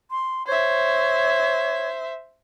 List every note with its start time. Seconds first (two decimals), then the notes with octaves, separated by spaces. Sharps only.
0.11 C6
0.47 C5 C#5 E5